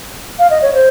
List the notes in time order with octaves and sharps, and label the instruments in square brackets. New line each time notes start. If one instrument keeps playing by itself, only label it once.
[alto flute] F5
D#5
C#5
C5